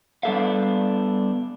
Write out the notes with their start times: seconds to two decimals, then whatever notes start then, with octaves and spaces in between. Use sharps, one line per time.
0.23 G3 B3 D4 A4 E5 F5